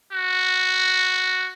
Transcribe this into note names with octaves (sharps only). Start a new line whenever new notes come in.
F#4